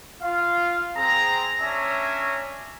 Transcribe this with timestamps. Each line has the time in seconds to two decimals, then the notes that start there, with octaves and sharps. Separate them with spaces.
0.22 F4 F5
0.96 C4 G#4 A#5
1.61 C#4 D4 C#5 E5 G#5 A#5